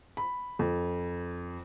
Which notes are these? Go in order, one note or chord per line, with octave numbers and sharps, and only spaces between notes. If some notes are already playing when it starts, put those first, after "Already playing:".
B5
F2